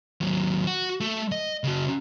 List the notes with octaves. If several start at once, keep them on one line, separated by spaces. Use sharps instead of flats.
D#2 F#3
F#4
A3
D#5
C#3 F#4